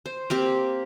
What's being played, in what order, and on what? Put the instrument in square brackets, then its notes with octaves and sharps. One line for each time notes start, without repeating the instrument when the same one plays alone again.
[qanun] C5
A#3 C4 G4